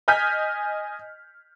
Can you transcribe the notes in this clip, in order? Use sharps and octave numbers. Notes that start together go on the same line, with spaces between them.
D#5 G#5 F6 G6 G#6 B6